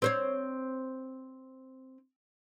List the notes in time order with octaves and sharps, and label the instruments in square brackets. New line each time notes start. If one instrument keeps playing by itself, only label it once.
[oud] C4 C5 C#5